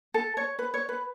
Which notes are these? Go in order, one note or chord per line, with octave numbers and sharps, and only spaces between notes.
A4
C#5
B4
C#5
B4